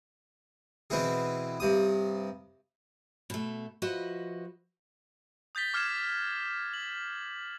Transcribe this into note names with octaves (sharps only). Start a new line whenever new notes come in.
B2 E3 B3 C4 E4 G#4
G2 C3 D#6
B2 A3
F3 F#4 B4 D#5 E5
D#6 G6 A6 B6 G7
D6 F6 G#6 C7 E7
F#7